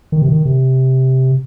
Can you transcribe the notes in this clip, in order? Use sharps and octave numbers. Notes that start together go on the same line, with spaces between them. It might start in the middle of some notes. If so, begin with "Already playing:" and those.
D#3
C3
D#3
C3